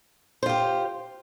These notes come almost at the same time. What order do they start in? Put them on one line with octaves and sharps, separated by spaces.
C5 F4 G4